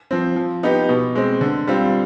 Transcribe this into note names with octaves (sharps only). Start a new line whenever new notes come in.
F3 C4
F3
B3 D#4 G4
B2
G#3 C4
D3
G3 C4 F4